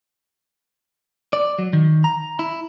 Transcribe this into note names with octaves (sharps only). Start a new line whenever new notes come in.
D5
F#3
D#3
A#5
E4